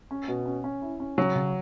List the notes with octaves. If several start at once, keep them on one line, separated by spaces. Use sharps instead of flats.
C#4
B2
C#4
C#4
E4
C#4
C#3 F#3
C#3